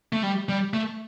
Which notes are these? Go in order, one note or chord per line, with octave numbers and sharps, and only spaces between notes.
A3
G3
G3
A3